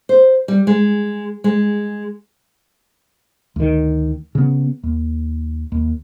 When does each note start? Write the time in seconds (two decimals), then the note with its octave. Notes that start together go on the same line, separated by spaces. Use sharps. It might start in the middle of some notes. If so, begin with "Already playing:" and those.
0.09 C5
0.48 G3
0.67 G#3
1.44 G#3
3.56 D2 D#3
4.35 C#3 B3
4.83 D#2
5.72 D#2